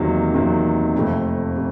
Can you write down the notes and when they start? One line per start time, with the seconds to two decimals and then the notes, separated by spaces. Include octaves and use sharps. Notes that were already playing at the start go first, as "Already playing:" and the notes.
Already playing: E2 C3 D#3 F#3 A#3
0.34 E2 C3 D#3 F#3 A#3
0.95 F1 F2 C3 F3 A3
1.56 C3